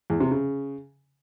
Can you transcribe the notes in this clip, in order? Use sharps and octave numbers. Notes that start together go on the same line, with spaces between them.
E2
C3
C#3